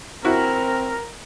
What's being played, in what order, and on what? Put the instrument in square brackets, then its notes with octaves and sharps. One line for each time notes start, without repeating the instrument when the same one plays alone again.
[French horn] C4 [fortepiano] E4 F#4 [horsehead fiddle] A#4